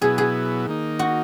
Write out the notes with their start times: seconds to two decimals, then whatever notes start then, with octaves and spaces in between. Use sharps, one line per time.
0.01 B2 F#3 B3 E4 G#4
0.18 G#4
0.66 D#3 A#3 D#4
0.99 F#4